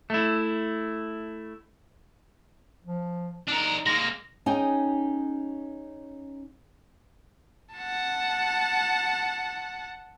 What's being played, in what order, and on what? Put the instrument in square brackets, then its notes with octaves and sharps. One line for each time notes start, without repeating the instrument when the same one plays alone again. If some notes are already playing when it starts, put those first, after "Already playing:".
[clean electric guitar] A3 E4
[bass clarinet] F3
[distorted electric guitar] D4 A#4 [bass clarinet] D#4
[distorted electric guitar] G#3 A#3 [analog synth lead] A#6
[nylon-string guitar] C#4 D#4 G#4 G5 G#5
[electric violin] F#5 A5